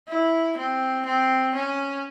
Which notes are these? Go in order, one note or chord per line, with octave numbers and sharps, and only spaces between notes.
E4
C4
C4
C#4